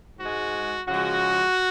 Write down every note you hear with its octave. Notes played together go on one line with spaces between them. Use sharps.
G#2 G#3 F#4
C#3 F3 G#3 F#4